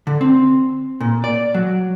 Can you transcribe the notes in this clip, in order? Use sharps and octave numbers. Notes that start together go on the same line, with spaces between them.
D3
C4
A#2
D5
F#3